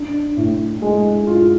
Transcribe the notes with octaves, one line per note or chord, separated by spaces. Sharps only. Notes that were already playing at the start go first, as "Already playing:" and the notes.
Already playing: D4
A2
G#3
F4